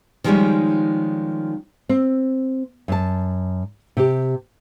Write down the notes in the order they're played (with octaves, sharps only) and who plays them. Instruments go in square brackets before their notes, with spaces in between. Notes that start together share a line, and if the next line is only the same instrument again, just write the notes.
[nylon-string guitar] D#3 F3 G3 G#3 C#4 D#4
C4
F#2 A5
C3 G4